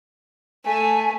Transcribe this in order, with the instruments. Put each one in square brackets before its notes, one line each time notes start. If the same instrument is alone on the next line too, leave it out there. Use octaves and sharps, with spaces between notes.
[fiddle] A3 [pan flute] G#5